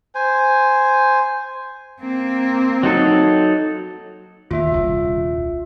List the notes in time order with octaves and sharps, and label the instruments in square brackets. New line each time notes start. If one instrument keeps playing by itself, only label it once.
[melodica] C5 G#5
[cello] A#3 C4
[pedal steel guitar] F#3 D#4 A4
[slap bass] D#2 A#2 [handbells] F4 E5
[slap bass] D#1 C2 C#3